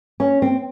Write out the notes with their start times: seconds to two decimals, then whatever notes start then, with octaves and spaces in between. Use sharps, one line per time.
0.20 C#4
0.42 C4